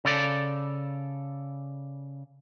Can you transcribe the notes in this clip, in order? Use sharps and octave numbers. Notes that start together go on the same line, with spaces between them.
C#3 A4 D5